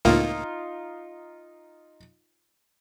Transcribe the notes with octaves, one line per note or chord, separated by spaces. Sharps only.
C#2 A2 A#3 D#4 F4